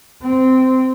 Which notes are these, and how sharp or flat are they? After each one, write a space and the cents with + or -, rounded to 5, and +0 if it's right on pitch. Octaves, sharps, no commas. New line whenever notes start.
C4 -15